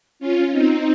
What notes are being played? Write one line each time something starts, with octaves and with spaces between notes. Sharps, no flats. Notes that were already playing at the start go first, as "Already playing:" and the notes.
C#4 F4
C4 D#4